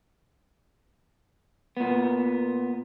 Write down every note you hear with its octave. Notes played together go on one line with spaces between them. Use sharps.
A#2 B3